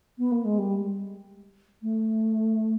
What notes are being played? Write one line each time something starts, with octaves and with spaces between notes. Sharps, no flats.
B3
A#3
G#3
G3
A3